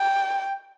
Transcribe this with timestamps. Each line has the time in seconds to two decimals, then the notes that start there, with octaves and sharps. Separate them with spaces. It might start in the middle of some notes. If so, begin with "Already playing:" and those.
Already playing: G5